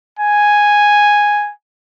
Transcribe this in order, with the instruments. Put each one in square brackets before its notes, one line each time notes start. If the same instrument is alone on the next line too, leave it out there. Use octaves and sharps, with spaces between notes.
[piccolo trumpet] G#5